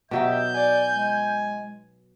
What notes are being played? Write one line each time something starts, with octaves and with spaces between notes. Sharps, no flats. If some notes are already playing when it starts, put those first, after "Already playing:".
B2 F#3 D#4 G4 E5 G6
D5 G#5
G#3